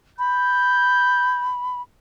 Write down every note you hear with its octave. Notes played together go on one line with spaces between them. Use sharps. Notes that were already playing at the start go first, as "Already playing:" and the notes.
B5 G6